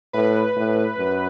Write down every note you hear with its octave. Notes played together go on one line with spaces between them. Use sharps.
A2 B4
A2
F#2